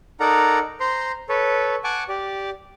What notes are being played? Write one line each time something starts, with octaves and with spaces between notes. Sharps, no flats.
D#4 A4 A#4 D5 F#5 A#5
C5 A#5 C6
A4 B4 C#5
F#5 G#5 A5 C#6 D6
G4 D5